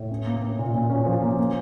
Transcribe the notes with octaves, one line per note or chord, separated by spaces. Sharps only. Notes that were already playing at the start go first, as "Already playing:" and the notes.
Already playing: A2
C#4
A#3
C#4
A#2
A#2
C#4
F3
A#3
A#3